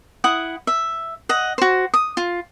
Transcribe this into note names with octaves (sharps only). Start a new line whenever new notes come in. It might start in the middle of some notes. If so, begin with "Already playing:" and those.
E4 F#5 D#6
E5
D#5 F#5
F#4 C5
D#6
F4